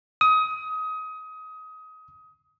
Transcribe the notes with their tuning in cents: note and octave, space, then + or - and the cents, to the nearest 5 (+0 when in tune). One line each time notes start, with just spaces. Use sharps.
D#6 +25